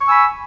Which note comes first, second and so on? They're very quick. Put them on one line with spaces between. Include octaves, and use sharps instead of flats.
C#6 G#5 E6 B5